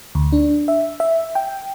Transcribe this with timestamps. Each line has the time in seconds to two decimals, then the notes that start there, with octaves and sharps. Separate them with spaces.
0.15 D2
0.32 D4
0.68 E5
1.00 E5
1.35 G5